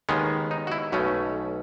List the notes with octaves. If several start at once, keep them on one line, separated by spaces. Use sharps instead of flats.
D#2 D#3 G#3 B3 C#4
D#4
F#4
E4
B1 B2 A3 C#4